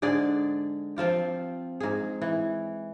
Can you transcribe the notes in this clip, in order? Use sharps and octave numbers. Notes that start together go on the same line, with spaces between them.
G#2 D3 G#4 D5
F3 C4 F4 G4
G#2 G#4
E3